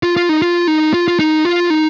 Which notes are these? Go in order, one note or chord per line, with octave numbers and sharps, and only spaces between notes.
F4
F4
D#4
F4
D#4
F4
F4
D#4
F4
D#4